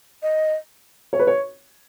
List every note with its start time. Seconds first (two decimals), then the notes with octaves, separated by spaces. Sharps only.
0.23 D#5
1.13 C#5
1.19 B4
1.27 C#5